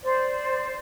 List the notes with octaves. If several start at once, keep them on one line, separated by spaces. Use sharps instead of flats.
C5 D5